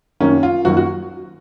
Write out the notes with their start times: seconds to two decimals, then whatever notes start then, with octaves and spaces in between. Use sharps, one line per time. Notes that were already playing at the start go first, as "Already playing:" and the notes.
0.20 F#2 D#3 F#3 A#3 C#4
0.43 F4
0.65 F#2 D#3 F#3 A#3 F#4
0.77 F#4